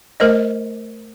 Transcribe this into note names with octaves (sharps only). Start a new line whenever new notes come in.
A3 A#4 C5 D#5